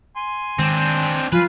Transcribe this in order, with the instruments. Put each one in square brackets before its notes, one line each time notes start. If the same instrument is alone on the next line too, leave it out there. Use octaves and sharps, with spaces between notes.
[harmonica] G#5 C6
[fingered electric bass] D#3 G#3 [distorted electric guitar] C4 D4
[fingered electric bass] F3 F#3 [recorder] F4 [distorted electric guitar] B4 [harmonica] G#5